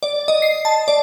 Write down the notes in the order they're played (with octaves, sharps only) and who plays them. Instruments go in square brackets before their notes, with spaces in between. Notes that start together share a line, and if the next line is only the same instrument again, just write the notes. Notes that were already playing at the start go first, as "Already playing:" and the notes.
[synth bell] D5
D#5
C7
A5
D5